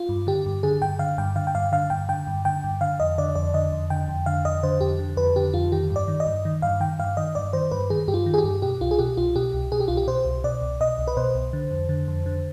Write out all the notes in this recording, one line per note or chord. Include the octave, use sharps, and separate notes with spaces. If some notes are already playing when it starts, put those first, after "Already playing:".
Already playing: F4
G2
D3 G4
G2
D3 G#4
G2 G5
D3 F5
G2 G5
D3 F5
G5
G2 F5
D3 F5
G2 G5
D3 G5
G2
D3 G5
G2
D3 F5
F2 D#5
D3 D5
F2 D5
D3 D#5
F2
D3 G5
F2
D3 F5
F2 D#5
D3 C5
F2 G4
D3
F2 B4
D3 G4
F2 F4
D#3 G4
G2
D5
D#3
D#5
G2
D#3
G2 F5
D#3 G5
G2 F5
D#3 D#5
G2 D5
D#3 C5
G2 B4
D#3 G#4
G2 G4
F4
D#3
G#4
G4
G2
B2 G4
C2 F4
G#4
B2 G4
C2 F4
B2 G4
C2
B2 G#4
G4
C2 F4
G4
B2 C5
C2
B2 D5
C2
B2 D#5
C2
B4
B2 C5
C2
D3
F2
D3
F2
D3